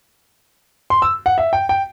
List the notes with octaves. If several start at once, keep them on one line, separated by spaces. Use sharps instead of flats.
C6
E6
F#5
E5
G5
G5